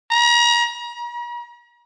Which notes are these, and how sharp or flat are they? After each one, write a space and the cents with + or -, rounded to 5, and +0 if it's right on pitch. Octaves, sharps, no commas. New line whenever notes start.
A#5 +35
A#5 +45